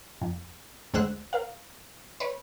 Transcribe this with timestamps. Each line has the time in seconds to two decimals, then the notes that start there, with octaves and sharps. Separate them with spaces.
0.21 F2
0.94 D2 G#3 C5 F#5 E6 F#6
1.33 A#4 F5
2.20 B4 C#5